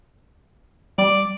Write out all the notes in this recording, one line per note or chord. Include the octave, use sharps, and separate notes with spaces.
G3 D5